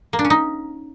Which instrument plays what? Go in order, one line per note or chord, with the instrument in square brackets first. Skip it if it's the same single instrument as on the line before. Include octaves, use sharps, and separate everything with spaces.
[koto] A#3
D4
C#4
D#4